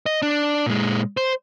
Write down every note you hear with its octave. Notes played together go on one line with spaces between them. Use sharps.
D#5
D4
A#2 G#3
C5